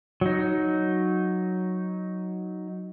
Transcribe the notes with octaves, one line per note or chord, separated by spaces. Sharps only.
F#3 D#4